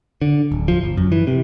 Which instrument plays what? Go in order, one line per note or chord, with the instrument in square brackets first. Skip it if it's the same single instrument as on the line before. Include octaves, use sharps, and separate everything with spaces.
[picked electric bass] D3
D1
F3
G1
F#2
E3
C3